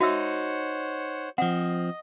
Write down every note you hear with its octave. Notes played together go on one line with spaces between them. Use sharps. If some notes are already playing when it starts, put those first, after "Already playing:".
D#4 F#4 C5 C#5 E5 F#5 E6
F3 C4 D#5 F#5